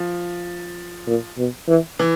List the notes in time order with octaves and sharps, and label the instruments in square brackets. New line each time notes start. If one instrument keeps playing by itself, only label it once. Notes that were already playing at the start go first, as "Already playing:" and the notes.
Already playing: [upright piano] F3
[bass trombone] A#2
B2
E3
[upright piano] E3